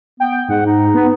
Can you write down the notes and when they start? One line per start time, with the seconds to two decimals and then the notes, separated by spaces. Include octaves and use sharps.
0.20 B3 G5
0.49 G#2 F#5
0.66 D#4
0.94 B3